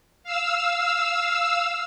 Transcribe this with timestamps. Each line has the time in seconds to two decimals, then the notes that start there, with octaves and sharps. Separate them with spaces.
0.23 F5 E6